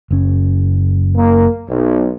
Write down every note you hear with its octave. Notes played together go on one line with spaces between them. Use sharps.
F#1 C#4
A#3
B1